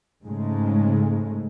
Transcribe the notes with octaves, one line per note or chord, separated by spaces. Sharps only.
G#2 C#3 G#3 A3